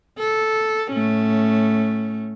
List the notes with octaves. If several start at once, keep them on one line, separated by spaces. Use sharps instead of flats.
A4
A2 A3 C#4